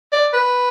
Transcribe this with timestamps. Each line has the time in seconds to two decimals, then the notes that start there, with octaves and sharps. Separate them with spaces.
0.13 D5
0.33 B4